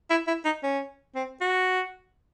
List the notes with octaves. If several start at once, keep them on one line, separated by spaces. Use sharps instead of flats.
E4
E4
D#4
C#4
C4
F#4